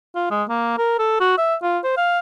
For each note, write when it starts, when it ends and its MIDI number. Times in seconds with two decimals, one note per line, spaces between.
0.15 0.27 65
0.31 0.43 56
0.49 0.76 58
0.78 0.94 70
0.99 1.19 69
1.20 1.36 66
1.38 1.55 76
1.63 1.78 65
1.84 1.95 72
1.97 2.19 77